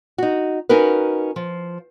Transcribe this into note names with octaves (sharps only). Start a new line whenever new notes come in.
D#4 F#4
C#4 D#4 F#4 A#4 B4
F3